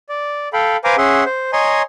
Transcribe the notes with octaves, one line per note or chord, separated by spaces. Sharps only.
D5
A4 F5 G5 B5
B4 C5 F5 G#5 A#5 D6
C#4 G#4 E5 F#5 C6
C5
C#5 D#5 G#5 A#5 C6